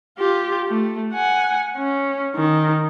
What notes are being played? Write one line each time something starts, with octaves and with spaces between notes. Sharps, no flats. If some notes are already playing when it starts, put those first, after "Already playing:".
F4 G4
A3
F#5 G#5
C#4
D#3